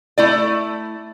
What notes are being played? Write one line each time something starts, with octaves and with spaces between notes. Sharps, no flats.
A3 E4 D5